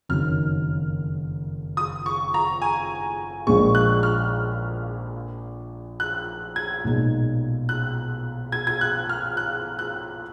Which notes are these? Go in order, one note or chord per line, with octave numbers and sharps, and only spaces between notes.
F#1 F2 D#3 F#3 F6
D#6
C#6
A#5
G#5
A#1 A#2 G#3 C#6
F#6
F6
F#6
G#6
B1 A#2 G#3 D#4
F#6
G#6
G#6
F#6
F6
F#6
F#6